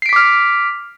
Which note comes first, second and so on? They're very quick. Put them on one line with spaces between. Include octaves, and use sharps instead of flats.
C7 D7 B6 D6 F6